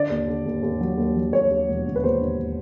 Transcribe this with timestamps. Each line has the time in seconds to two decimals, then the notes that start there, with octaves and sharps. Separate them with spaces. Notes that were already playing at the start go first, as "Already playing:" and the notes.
Already playing: D3 D5
0.10 D#2
0.28 D3
0.45 D#2
0.63 D#2
0.81 F#3
0.97 D#2
1.15 F#3
1.33 D#2 C#5
1.51 D#2
1.69 E1
1.86 D3
1.96 B4
2.03 D#2 C5
2.21 D3